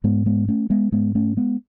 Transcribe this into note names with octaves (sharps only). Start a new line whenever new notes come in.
G#2 G#3 B3
G#3 B3
A3 C#4
G#3 B3
G#2 G#3 B3
A3 C#4
G#3 B3